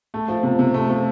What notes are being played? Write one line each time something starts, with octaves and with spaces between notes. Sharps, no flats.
A3
F3
C3
C3
A3
F3